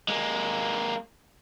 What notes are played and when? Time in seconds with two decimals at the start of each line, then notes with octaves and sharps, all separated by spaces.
0.08 G#3 A#3